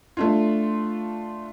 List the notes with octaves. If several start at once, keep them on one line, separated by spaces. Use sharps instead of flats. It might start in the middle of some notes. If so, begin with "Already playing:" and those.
A3 D4 F4